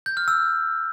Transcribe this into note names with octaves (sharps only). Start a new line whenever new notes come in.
G6
F6
E6